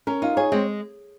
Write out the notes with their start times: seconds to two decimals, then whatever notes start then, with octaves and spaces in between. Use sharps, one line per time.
0.07 C#4 A#4
0.22 D#4 F4
0.37 G#4 C#5
0.52 G#3 C4